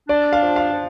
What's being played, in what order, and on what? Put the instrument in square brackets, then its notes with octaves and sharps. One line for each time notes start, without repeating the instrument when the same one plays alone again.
[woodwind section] D4 [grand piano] D5
[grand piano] F5
[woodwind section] F3
[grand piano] F5
[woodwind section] F3